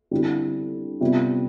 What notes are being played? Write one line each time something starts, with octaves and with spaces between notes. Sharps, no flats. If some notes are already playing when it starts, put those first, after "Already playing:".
D3 G3 C4 E4 G4
C3 G3 B3 F4